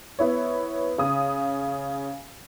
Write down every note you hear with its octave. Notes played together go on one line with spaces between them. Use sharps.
B3 E4 C#5
C#3 D#6